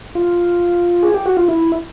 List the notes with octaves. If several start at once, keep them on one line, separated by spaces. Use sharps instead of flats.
F4
G#4
G4
F#4
F4
E4